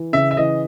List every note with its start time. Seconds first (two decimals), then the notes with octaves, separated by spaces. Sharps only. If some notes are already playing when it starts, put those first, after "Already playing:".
Already playing: E3
0.13 C#3 E5
0.31 E5
0.37 E3 D#5